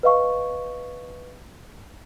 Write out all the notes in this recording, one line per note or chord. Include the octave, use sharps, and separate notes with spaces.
B4 D#5 F5 C#6